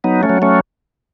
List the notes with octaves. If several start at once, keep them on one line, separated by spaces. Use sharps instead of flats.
F#3 B3 D#4
A3 C#4
F#3
A3 C#4